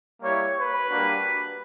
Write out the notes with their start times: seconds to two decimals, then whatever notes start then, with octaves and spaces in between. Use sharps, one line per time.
0.21 G3 A#3 E4 G4 C#5
0.56 B4
0.89 G3 A#3 D4 F#4